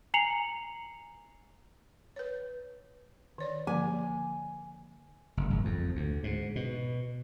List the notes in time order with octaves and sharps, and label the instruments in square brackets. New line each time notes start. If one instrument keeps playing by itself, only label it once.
[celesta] G#5 A#5 C7 C#7 F7 F#7
[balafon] B4 C#5
D#3 C#5 D5
[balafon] D3 F3 A#3 [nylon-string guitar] G#5
[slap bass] F#1
G#1
F2
D2
G#2
B2